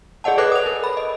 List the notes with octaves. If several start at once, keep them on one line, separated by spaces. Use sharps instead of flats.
G#4 D5 D#5 F#5 A5
A4 B4 C#5 D6 F#6
D#6 F7
A#4
B5
D#5